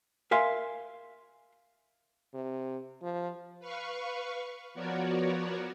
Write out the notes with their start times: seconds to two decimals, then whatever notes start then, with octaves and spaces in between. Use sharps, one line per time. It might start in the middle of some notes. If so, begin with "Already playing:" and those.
0.31 A#4 E5 F5 G#5 C6
2.34 C3
3.02 F3
3.60 B4 F5 C#6
4.74 F3 B3 F#4 A#4 C#5 D5